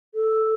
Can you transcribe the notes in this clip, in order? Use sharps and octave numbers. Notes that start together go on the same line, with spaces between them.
A4